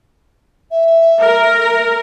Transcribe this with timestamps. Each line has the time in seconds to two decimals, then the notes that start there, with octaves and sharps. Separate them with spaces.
0.71 E5
1.23 A#4